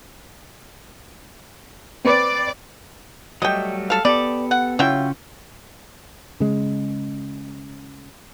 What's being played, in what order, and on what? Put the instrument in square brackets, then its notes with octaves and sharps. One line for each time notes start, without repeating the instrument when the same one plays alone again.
[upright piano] C4 B4 [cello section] D5
[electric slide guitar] F#3 G3 A3 [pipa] D#5 G5
[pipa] A4 F5
[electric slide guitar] B3 G4 A4 [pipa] D5
[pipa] F#5
[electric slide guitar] C#3 C#4 F4 [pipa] F#3 E4 G5
[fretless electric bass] C#3 G#3